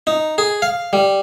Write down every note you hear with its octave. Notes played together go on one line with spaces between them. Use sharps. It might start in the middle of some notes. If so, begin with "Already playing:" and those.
D#4
G#4
F5
G3